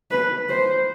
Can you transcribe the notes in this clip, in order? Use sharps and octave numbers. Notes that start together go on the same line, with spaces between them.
B4
C5